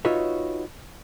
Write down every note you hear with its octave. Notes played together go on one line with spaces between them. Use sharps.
D#4 F4 F#4 B4 C#5 E5